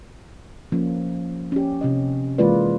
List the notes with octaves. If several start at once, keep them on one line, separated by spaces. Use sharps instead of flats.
F3 A#3 C#4
C#4 G4
C3 C#4 D#5
E3 G#3 A#3 F4 B4 D5